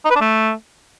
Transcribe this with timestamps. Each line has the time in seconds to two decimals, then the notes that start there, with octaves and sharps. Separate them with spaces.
0.05 D#4
0.10 B4
0.16 D4
0.21 A3